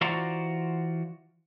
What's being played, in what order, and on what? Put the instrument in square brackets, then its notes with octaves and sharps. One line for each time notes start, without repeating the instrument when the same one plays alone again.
[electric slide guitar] E3 F4 F#4 C5 D5 A#5